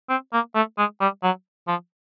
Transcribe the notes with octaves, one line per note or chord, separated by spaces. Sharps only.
C4
A#3
A3
G#3
G3
F#3
F3